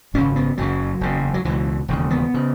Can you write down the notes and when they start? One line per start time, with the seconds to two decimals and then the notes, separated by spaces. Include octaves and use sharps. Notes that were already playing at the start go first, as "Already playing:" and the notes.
0.14 G#1 F#2 C#3 C#4
0.36 B3
0.58 F#1 F#2 C#3 F#3
1.01 F#1 E2 C#3
1.34 F#3
1.45 C#2 B2 E3
1.88 E1 D#2 C#3
2.10 B3
2.34 C#3